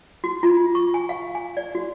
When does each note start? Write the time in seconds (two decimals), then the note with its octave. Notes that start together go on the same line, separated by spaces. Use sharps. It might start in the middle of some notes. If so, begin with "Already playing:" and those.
0.24 F#4
0.43 F4
0.75 C#6
0.94 G#5
1.09 F5
1.35 G#5
1.57 D5
1.75 F#4